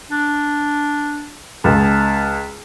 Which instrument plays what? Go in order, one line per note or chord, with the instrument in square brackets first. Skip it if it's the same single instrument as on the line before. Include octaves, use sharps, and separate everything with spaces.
[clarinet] D4
[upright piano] C#2 [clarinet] A5